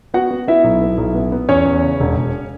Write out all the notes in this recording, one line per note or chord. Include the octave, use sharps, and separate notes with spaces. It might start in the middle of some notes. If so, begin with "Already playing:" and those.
B3 F#4 F#5
B3
B3 E4 E5
B1
B3
B1
B3
B3
E2 C#4 C#5
E2
C#3
E1
E1